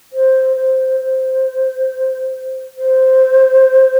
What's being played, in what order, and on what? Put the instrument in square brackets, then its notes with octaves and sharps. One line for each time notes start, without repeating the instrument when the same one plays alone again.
[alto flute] C5
C5
C5
C5